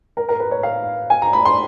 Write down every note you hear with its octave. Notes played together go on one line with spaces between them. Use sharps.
A#4
A#4
B4
C#5
F5
G#5
A#5
B5
C6